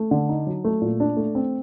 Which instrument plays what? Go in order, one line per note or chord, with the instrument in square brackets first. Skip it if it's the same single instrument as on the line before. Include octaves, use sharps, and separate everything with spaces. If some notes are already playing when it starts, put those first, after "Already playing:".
Already playing: [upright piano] A3
D3
D#4
F#3
A3
A#2
D4
A3
C4